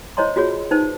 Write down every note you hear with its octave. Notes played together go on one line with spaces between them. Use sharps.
E4 C5 C#5 D#5 A#5 C6
F4 F#4 G#4 C#5
D#4 B4 C5 A5